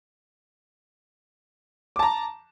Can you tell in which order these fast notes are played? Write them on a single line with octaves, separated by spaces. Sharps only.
D6 A5 A#5